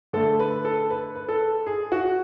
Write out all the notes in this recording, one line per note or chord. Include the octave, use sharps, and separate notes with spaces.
D3 A3 A4
B4
A4
B4
B4
A4
G#4
F#4